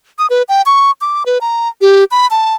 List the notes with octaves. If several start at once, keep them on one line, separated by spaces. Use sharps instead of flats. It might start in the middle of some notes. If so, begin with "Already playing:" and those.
D#6
B4
G5
C#6
D6
B4
A#5
G4
B5
A5